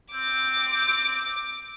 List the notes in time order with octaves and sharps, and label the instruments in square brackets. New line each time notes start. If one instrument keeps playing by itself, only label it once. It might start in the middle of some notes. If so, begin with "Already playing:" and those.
[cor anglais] C4 [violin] D6